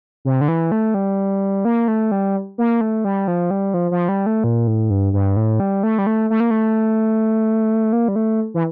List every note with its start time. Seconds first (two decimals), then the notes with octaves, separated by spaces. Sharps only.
0.25 C3
0.41 D3
0.48 E3
0.72 A3
0.94 G3
1.65 A#3
1.88 A3
2.12 G3
2.58 A#3
2.81 A3
3.05 G3
3.28 F3
3.51 G3
3.74 F3
3.91 F3
4.09 G3
4.26 A3
4.44 A#2
4.67 A2
4.90 G2
5.13 G2
5.36 A2
5.60 G3
5.83 A3
5.99 G3
6.07 A3
6.30 A3
6.40 A#3
6.51 A3
7.93 A#3
8.08 G3
8.16 A3
8.54 E3